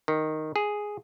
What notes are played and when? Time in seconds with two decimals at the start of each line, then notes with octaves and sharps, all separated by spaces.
0.08 D#3
0.56 G#4